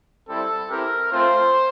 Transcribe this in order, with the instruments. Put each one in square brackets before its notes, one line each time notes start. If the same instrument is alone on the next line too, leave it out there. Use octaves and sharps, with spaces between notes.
[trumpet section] G3 C4 E4 A4
C4 E4 G4 A#4
A3 C4 F4 C5